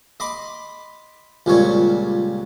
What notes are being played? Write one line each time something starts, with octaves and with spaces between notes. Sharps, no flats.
D#5 B5 C6 D6
C#2 A#2 G3 C4 C#4 C#5